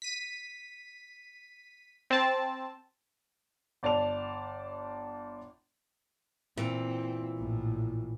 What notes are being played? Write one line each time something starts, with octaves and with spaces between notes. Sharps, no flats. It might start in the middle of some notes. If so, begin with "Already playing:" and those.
B6 D#7
C4 A5
G1 D5 A5 F7
A#2 E3 C4
A#1 A2